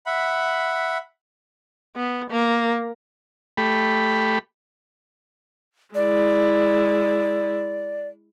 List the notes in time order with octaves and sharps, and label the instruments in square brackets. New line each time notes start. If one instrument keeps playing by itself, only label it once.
[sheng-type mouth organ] E5 F#5 B5
[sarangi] B3
A#3
[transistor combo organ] A3 G4 B5
[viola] G#3 E4 [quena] D5